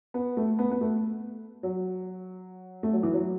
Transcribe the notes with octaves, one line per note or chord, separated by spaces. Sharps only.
B3
A3
B3
B3
A3
F#3
A3
F#3
E3
F#3